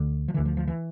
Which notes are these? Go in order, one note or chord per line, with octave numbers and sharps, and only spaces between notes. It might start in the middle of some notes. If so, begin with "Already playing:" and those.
Already playing: D2 D3
F3
D2 D3 E3
F3
F3
E3